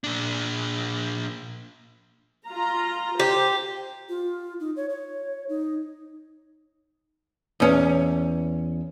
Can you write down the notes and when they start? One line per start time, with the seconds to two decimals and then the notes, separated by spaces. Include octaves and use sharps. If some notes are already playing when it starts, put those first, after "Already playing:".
0.04 A#2 D4
2.47 F4 A#5
3.20 G4 C5
4.09 F4
4.60 D#4
4.76 C#5
4.90 C#5
5.49 D#4
7.60 E2 C#4